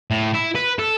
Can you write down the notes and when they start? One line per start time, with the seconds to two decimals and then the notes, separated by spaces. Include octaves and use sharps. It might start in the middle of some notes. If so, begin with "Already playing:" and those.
0.11 A2
0.35 E4
0.56 B4
0.79 A4